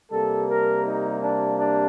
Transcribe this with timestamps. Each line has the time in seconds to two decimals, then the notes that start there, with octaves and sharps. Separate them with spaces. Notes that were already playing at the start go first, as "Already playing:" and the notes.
0.11 C3 G3 A#3 A4
0.48 A#4
0.85 D#4
1.21 D4
1.58 D4